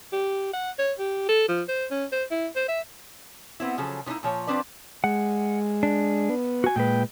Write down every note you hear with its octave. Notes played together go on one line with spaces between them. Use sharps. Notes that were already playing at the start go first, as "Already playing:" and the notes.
G4
F#5
C#5
G4
A4
F3
C5
C#4
C5
E4
C5
E5
B3 C4 E4
C#3 F3 F#3 G#4 A4
D#3 F3 A#3 D#4 E4
A#2 F3 C#5
F3 A3 C4 D4 B4 D5
G#3 F#5
D4
B3
F#4 G#5
A#2 G#3 B4 G5